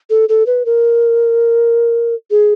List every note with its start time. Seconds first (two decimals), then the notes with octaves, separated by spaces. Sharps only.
0.10 A4
0.29 A4
0.46 B4
0.66 A#4
2.31 G#4